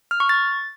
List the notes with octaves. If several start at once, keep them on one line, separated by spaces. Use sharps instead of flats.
F6
C#6
A6